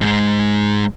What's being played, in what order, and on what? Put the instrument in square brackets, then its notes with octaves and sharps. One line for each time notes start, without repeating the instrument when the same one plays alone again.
[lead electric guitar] G#2 G#3